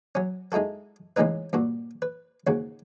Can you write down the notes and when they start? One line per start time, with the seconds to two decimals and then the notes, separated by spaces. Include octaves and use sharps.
0.15 F#3 C#4
0.52 G#3 D#4 E4 F#4 A4
1.16 C#2 A2 E3 G#3 D#4 B4
1.53 G2 A#2 F#4
2.02 B4
2.47 D#2 G#2 C#3 F#4